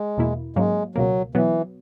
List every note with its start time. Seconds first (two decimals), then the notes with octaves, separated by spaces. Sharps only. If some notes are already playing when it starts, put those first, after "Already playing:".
Already playing: G#3
0.17 E2 B2 A#3 E4
0.56 G#2 F#3 G#3 A#3 C#4
0.95 C#2 B2 F#3 A#3
1.35 B2 E3 F#3 B3